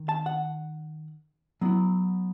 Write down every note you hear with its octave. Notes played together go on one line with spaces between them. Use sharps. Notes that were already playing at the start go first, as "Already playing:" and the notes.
Already playing: D#3
A5
F#5
F#3 B3 E4